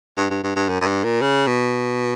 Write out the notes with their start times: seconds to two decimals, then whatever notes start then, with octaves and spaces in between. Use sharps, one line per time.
0.18 G2
0.30 G2
0.44 G2
0.56 G2
0.69 F#2
0.81 F#2
0.87 G2
1.04 A#2
1.22 C#3
1.47 B2